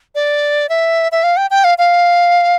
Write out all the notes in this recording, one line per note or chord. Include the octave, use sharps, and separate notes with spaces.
D5
E5
E5
F5
G5
G5
F5
F5